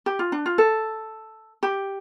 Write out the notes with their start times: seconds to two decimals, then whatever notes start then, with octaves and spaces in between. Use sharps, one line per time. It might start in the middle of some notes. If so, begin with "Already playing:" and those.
0.06 G4
0.19 F4
0.32 D4
0.46 F4
0.58 A4
1.63 G4